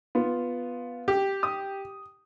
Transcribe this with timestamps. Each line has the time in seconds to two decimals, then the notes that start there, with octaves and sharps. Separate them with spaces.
0.15 B3 F4
1.08 G4
1.43 D#6